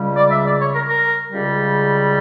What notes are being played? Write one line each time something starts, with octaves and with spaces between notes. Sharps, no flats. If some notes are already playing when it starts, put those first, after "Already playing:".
Already playing: C#2 C#3 G3
D5
E5
D5
C#5
A#4
A#4
C#2 C#3 G3